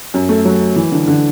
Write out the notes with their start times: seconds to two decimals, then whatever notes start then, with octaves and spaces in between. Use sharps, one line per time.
0.14 F#2
0.29 A3
0.45 F#3
0.76 E3
0.92 D3
1.08 D3